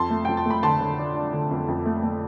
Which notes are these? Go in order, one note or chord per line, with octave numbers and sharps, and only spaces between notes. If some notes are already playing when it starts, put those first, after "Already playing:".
Already playing: F2 A5 C6
A3
F2 G5
A5
A3
B5
D3 A5 C6
D3
D4
D4
D3
F2
F2
A3
A3